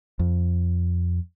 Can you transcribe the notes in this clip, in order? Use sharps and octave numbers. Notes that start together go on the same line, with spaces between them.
F2